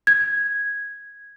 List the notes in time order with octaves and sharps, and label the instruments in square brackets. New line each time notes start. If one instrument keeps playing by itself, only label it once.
[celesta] G#6